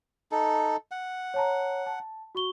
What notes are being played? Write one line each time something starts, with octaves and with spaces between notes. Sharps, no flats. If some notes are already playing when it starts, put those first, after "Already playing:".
D#4 A4
F#5
C#5 A5 A#5
A5
F#4 C#6 G7